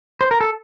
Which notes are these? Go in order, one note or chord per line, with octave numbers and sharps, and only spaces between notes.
C5
A#4
A4